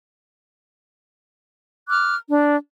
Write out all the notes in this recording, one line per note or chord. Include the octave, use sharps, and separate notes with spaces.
D6 F6 F#6
D4